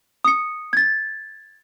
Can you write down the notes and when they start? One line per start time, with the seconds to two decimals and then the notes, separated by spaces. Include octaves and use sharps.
0.24 D#6 C#7
0.73 G#6 A6